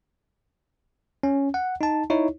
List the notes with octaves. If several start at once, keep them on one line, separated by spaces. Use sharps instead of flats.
C#4
F#5
D#4 A5
D#4 E4 C#5